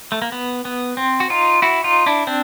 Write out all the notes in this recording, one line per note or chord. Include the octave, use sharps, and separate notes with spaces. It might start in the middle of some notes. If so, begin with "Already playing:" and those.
A3
A#3
B3
B3
C4
F#4
D#4 F4
E4 F#4
D#4 F4
D4 E4
C4 D4